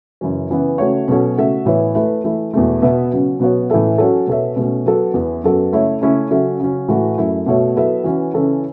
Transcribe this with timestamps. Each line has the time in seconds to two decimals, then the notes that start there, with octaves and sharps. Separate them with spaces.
0.21 F#2 C#3 E3 C#4
0.50 C#3 E3 B3
0.78 C#3 A3 F#4 C#5
1.08 B2 F#3 C#4 A4 C#5
1.37 C#3 A3 F#4 A4 E5
1.65 A2 E3 B3 E4 C#5
1.95 A3 E4 B4
2.24 E3 A3 E4
2.54 E2 B2 A3
2.82 B2 B3 F#4 B4 E5
3.11 C#3 F#3 C#4
3.40 B2 F#3 B3 F#4 C#5
3.70 A2 E3 C#4 A4 E5
3.98 F#3 C#4 F#4 A4 C#5
4.27 B2 B3 A4 C#5 E5
4.56 B2 A3 C#4
4.86 F#3 B3 A4
5.14 E2 E3 B3
5.43 F#2 F#3 B3 A4
5.73 C#3 A3 E4 C#5 E5
6.01 C#3 A3 C#4 E4
6.30 C#3 F#3 C#4 A4 E5
6.60 C#3 F#3 C#4
6.88 A2 E3 A3 F#4
7.17 F#2 F#3 A3 E4
7.46 B2 A3 F#4 C#5 E5
7.76 F#3 B3 E4 A4 E5
8.04 E3 C#4 F#4
8.33 C#3 E3 C#4 A4